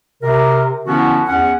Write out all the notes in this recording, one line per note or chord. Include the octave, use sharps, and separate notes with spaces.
C3 A#4
D3 F3 B3 C#4 E4 F#4
E2 C#4 F#5